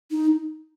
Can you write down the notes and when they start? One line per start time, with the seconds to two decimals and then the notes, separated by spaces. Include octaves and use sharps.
0.11 D#4